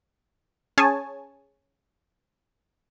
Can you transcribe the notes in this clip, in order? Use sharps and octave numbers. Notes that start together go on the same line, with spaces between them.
C#4 G#4 C#5 G#5 A5